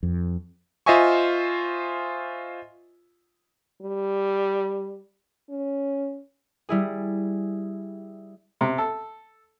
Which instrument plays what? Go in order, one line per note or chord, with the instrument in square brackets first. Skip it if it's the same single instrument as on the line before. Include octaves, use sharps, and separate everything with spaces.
[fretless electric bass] F2
[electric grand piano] F4 C5 D#5 E5 G#5 C#6
[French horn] G3
C#4
[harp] G3 E4 G#4
[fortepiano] C3
A4